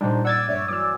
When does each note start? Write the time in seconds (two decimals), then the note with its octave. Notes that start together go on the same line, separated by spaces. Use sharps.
0.01 A#2 G3 D4 D#4 C5
0.25 D5 F#5 E6 G#6 A6
0.48 G2 C#5 D5 E5
0.68 E3 F#3 D5 D6 E6